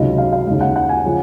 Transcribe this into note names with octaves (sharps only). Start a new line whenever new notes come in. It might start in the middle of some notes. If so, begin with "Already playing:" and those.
Already playing: C#2 C3 D#3 F#3 D#5
F5
F5
D#2 C#3 G#3
F#5
F#5
G#5
C#3 F3